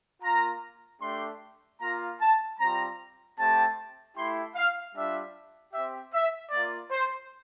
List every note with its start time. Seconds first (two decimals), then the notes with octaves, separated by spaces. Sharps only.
0.23 A#3 F4 A#5
1.01 A3 D4 G4 C6
1.80 A#3 F4 A#5
2.20 A5
2.58 G3 C4 F4 A#5
3.37 A3 C4 G4 A5
4.15 A3 E4 G4 C6
4.55 F5
4.94 G3 D4 F4 E5
5.72 C4 G4 E5
6.13 E5
6.51 A#3 D5
6.56 F4
6.90 C5